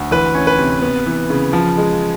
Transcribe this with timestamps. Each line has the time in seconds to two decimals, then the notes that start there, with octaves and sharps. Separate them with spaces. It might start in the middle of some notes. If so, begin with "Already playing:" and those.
Already playing: D2
0.11 E3 B4
0.35 C#4
0.47 B4
0.58 C3
0.82 B3
1.06 E3
1.30 C#3
1.53 F3
1.77 G#3